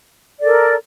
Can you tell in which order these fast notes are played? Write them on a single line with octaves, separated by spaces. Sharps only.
D5 A4 A#4